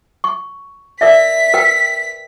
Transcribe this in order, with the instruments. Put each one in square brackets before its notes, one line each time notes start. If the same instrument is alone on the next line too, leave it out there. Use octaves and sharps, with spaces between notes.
[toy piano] C#6
[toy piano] A#4 D5 E5 [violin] B6
[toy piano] A#4 B4 G5